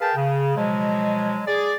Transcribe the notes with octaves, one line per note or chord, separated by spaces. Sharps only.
G#4 A#4 B4 F5 G5 A5
C#3
B2 F3 F#3 G#3
G#4 D5